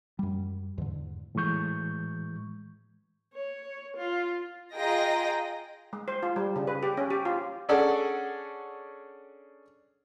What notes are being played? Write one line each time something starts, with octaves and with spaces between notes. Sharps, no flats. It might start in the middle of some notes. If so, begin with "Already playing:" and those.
F#2 G3
E2 G#2 D3
A2 E3 G#3 C#6 G6
C#5
F4
F4 G#4 D#5 G5 A#5 A#6
G#3
C5
F4
G3
C#3
B4
G4
C#4
G4
F4
C#4 D4 G#4 A4 D5 F#5